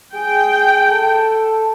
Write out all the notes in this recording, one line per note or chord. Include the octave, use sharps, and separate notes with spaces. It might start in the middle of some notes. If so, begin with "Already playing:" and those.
G#4 G5
A4